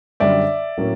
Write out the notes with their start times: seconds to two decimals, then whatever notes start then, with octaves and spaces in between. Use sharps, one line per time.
0.20 F#2 D3 G3 D5 E5
0.78 A2 F#3 A#3 C#4